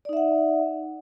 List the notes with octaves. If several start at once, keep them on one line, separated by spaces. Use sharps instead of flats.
D#4 D5 E5 F#5